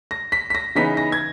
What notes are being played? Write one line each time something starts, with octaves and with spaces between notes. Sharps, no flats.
A#6
B6
B6
A#6
C#3 E3 B3 D#4 B6
A#6
G#6